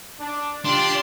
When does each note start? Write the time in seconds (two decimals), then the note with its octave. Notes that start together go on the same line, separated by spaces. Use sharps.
0.20 D4
0.65 D4 F4 G4 C6